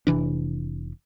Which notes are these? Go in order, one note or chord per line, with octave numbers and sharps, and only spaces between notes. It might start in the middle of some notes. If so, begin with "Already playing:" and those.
F1 C3 E3 D4